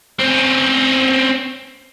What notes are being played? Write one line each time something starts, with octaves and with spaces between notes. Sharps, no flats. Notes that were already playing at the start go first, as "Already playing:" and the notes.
C4 C#4